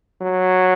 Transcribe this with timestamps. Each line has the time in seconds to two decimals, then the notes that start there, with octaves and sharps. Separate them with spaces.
0.21 F#3